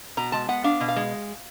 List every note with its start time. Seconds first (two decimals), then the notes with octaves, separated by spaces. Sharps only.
0.17 B2 A#5
0.32 G#3 A5
0.49 B3 F#5
0.64 D4 F5
0.81 B2
0.88 F5
0.96 G#3